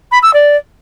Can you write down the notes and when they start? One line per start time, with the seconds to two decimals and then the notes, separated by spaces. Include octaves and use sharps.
0.11 B5
0.22 E6
0.33 D5